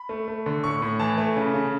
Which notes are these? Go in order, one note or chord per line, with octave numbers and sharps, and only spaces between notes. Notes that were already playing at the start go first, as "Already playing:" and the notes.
Already playing: B5
A3
A3
D3
A2 C#6
A2
E3 A5
A3
C#3
C#3